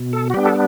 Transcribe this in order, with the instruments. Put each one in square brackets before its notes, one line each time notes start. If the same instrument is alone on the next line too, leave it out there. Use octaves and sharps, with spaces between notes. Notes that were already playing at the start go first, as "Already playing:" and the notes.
Already playing: [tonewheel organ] B2
A4
F#4
G3 B3 D4 G4
A4